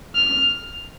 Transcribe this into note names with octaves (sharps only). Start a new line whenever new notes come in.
F6